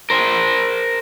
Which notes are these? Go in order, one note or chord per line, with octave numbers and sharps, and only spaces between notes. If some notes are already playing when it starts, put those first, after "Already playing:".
A#4 C5